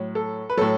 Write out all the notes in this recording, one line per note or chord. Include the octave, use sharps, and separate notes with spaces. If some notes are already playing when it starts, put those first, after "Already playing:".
Already playing: A2 F#3
A4
B4
A2 F#3 A4